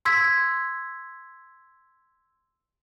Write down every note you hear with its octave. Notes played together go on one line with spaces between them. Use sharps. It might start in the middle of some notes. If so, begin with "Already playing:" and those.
C6 E6 G#6 B6